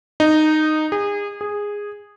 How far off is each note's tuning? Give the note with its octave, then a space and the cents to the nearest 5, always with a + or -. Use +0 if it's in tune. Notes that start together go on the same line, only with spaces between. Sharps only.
D#4 -10
G#4 -30
G#4 -10